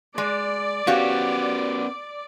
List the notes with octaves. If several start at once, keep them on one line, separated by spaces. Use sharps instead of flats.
G#3 D5
B3 C#4 F#4 G4 F5